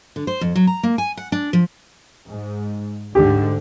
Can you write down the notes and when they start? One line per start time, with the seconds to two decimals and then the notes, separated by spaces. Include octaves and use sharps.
0.16 D3
0.27 C5
0.41 F2
0.56 F#3
0.67 A#5
0.83 A#3
0.98 G#5
1.17 F#5
1.32 D4
1.53 F3
2.28 G#2
3.15 D2 G#2 D3 G4